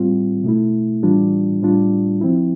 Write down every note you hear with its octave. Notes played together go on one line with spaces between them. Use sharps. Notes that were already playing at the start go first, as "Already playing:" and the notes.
Already playing: A2 G3 C4 F4
B2 A3 E4
A2 E3 G3 D4 F4
A2 G3 D4 F4
F3 C4 E4